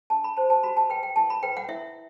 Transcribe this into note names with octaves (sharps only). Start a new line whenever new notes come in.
D4 A5
B5
G4 C5 A5
A5
F#4 B5
A5
B4 G5
G5
E4 A5
B5
B4 G5
F#5
E4 E5